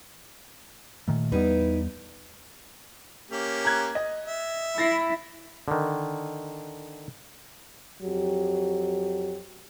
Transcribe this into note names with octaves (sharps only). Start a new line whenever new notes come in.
A#2 D#3 A3
E2 G3 B3 D#4 E4 B4
A#3 C#4 G4
A#5 F#6 G#6
D#5
E5
E4 A6 A#6 C7
D3 D#3
F2 F#3 G4